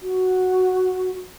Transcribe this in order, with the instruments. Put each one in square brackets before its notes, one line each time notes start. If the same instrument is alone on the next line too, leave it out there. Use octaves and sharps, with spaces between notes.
[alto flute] F#4